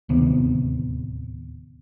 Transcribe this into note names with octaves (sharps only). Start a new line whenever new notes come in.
D1 D#2 C3 B3